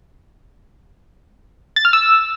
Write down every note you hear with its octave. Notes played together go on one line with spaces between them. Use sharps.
A6
F6
E6